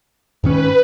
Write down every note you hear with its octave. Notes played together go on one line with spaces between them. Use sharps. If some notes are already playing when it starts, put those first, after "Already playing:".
G#2 D#3 C#4 B4